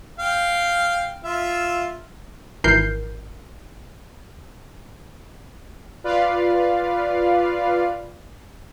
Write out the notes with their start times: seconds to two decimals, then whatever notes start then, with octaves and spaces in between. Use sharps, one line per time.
0.19 F5 G5
1.24 F4 E5
2.64 G#1 E3 A#4 G6 C7
6.04 F4 B4 D5 F5